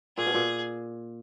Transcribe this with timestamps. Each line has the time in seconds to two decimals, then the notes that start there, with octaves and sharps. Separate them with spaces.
0.17 A#2 G#4
0.27 B2
0.34 A#2